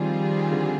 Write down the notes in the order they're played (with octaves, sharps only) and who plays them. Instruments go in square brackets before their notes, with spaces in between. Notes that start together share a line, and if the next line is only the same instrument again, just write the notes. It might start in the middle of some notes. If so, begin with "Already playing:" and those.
Already playing: [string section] D#3 G3 C4 F4 G#4 [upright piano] F3
[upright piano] D3